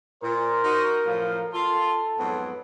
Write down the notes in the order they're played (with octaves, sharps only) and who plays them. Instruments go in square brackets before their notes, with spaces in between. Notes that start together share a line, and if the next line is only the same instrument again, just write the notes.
[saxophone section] A#2 [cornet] A#4 [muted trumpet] C5
[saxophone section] D#4 F#4
[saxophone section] F#2 A2 F3 [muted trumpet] F5
[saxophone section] F4 [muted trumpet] A4
[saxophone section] F2 G#2 F#3 [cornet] B3